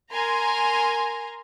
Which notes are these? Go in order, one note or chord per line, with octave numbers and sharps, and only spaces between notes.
A#4 G#5 A#5 C6